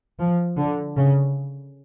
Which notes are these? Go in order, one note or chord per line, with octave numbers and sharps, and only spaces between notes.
F3
D3
C#3